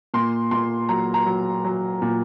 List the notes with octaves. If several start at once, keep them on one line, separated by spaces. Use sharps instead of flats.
A#2 C6
A#2 C6
F#3 A#5
A#5
F#3
F#3
A#2